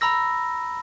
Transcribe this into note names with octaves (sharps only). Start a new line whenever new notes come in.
A#5 B5 E6 A#6